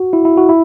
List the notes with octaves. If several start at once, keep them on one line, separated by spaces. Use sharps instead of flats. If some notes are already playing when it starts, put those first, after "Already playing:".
Already playing: F#4
E4
E4
F#4
E4